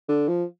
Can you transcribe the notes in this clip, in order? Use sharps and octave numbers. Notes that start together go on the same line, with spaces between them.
D3
F3